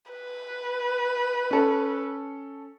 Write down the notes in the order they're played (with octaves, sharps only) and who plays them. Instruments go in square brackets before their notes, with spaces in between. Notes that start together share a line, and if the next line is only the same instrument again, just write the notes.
[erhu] B4
[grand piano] C#4 A4